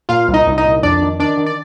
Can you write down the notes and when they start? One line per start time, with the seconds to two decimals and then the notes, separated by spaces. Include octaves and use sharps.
0.09 A#2 F4 F5
0.28 C2
0.34 D#4 D#5
0.47 C2
0.58 D#4 D#5
0.64 A#2
0.83 F2 D4 D5
1.02 D#3
1.19 D#3 D4 D5
1.37 D#3
1.46 D5